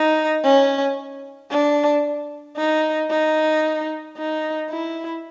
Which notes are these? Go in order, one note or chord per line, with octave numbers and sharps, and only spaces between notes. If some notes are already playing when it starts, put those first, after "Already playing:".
Already playing: D#4
C#4
D4
D#4
D#4
D#4
E4